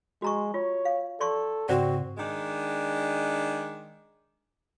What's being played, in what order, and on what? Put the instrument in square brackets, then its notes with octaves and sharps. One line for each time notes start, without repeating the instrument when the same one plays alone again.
[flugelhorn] G#3 [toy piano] F#4 A#5 C#6
[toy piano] F4 [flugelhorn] C#5
[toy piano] F5
[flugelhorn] A4 [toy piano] D5 C6 C#6
[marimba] G#2 C#3 [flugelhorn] C4 [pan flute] F#4 [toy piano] C5 D5 F#5
[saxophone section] D#3 G#3 D4